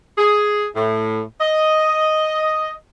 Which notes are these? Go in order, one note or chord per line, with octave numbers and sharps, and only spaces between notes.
G#4
A2
D#5